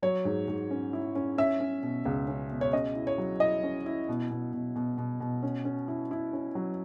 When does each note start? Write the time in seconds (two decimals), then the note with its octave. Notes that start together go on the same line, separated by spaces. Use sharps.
0.02 F#3 C#5
0.25 G#2
0.48 G#2
0.71 C#4
0.93 E4
1.15 C#4
1.38 C#4 E5
1.60 C#4
1.83 B2
2.05 C#2
2.28 C#4
2.50 B2
2.61 C#5
2.73 C#4 D#5
2.95 E4
3.07 C#5
3.18 F#3
3.40 E4 D#5
3.63 C#4
3.86 E4
4.09 B2
4.31 B2
4.53 B2
4.76 B2
4.98 B2
5.20 B2
5.43 C#4
5.65 C#4
5.88 E4
6.11 E4
6.33 C#4
6.55 F#3